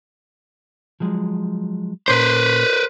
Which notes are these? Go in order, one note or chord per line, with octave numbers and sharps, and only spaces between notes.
F3 F#3 G#3
A#2 C#4 B4 C5 A#5